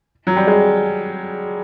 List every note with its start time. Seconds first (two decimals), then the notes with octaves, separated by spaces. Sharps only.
0.27 F#3
0.36 G3
0.47 G#3